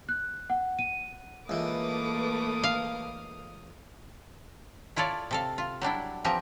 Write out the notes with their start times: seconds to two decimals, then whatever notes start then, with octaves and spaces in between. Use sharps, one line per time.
0.09 F#6
0.50 F#5
0.79 D#7
1.49 C#2 E3 A3 A#3 B4 D6 D#6
2.63 F5
4.96 E4 F4 A4 C#5 D5
5.31 C3 A4 F5
5.58 F4
5.81 F#3 G3 D4 E4
6.24 E3 F3 C4 G4 A#4